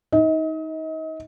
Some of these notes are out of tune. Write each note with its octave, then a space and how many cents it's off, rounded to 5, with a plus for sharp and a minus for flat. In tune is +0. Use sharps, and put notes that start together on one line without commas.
D#4 +20 D#5 +35